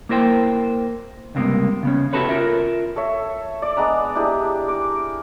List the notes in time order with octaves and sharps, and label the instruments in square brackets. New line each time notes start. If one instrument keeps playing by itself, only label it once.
[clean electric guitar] A#3 E4 A#4 C5 G5
C#2 G2 C3 A#3 B3
C#3 B3 C#4
E4 F#4 G4 A4 B4 C#5
F4 A#4 E5
[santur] A4 C#5 E5
D5 D6
G#3 B3 D4 A#5
D4 E4 G4 G#4
A#4 D6